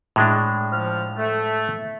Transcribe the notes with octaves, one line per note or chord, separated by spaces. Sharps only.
A2 G#3 D4
F3 F6
A3